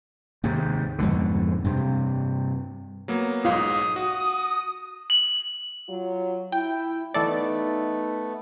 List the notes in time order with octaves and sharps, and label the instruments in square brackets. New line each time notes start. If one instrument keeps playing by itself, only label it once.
[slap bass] D#2 G#2 C3
F2 G#2 B2 D3
G2 C3
[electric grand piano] F#3 A#3 B3
[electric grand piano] B1 G#2 [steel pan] F4 [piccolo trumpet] D#6
[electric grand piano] F#4
[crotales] F#7
[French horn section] F#3 F4
[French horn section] E4 [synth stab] G5
[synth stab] E3 A4 D5 [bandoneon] A3 B3 [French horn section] D#4